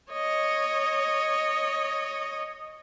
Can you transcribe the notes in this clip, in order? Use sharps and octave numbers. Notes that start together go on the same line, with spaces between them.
C#5 D#5